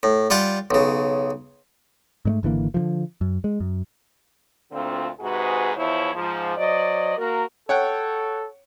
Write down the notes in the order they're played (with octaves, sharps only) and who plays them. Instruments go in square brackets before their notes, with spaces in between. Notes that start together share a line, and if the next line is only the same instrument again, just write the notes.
[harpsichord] A2
G3 F4 F#5 G5
B1 C#3
[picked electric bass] G#2 G#3 A3
G#1 D3 E3 A#3
D3 D#3 F3
F#2
G#3
F#2
[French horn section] D2 A#2 D3 C4 F4
G#2 C3 F#4 G#4 B4
E2 F3 E4 C5 C#5
G#2 F3
F#3 C5 D5 D#5
A#3 F#4 A#4
[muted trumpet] A4 [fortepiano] C#5 F#5 G5